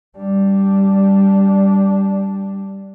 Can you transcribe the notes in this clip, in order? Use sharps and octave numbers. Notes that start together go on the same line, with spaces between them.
G3 D4